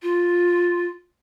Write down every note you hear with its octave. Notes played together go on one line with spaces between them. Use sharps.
F4